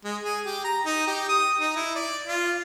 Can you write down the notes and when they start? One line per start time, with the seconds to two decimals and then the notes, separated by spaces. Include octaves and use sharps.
0.04 G#3
0.23 G#4
0.46 G4
0.64 A#5
0.86 D#4
1.07 G4
1.29 D#6
1.60 D#4
1.76 E4
1.95 D5
2.27 F4